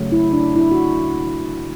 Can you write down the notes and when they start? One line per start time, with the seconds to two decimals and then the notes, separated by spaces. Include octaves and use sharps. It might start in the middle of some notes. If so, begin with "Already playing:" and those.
Already playing: C#3 F#3 A3
0.12 E4
0.33 D4
0.56 E4
0.71 F#4